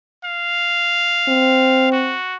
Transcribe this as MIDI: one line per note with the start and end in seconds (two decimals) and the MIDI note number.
0.25 1.91 77
1.28 2.15 60
1.92 2.37 66